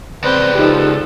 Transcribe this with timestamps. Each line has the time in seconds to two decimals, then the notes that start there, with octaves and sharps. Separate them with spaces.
0.24 C#2 C4 B4 C5 D5
0.55 F3 D#4 G4 A4